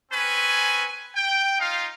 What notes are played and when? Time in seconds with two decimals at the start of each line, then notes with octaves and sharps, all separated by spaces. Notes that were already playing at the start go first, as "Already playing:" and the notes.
0.12 C4 C#4 B4 G#5
1.16 G5
1.59 D#4 F4 F5